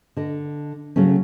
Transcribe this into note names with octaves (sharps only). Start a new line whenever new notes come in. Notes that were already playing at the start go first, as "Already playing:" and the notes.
D3 D#5
C#3 F#3 A3 C#4